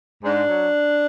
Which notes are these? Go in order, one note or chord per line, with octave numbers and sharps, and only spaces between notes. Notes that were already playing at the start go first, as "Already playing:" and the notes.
G#2 D4
F#3